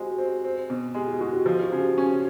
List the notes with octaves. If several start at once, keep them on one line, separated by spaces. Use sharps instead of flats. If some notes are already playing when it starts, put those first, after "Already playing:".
Already playing: G#3 C4 F#4 G4 C5
C4
C4
B2
G#3 G4
F#4
G#3 F#4
G4
F3
F#4
C#3
G4
C#4